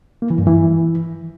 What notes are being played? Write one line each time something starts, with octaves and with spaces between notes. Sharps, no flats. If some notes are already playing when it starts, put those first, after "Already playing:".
A#3
E3
G2
E3